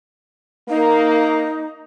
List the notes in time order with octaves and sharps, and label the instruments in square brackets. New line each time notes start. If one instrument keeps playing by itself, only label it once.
[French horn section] A#3 [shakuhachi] D#4